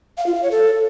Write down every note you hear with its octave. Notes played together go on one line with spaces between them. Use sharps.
F5
F4
F5
C#5
A4